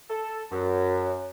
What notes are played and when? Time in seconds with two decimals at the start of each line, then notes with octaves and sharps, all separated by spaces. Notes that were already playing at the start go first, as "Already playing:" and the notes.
0.10 A4
0.52 F#2